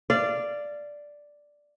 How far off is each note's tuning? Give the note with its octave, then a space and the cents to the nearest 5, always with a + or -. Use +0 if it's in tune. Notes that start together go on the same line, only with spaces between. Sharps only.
D5 +0 F5 -25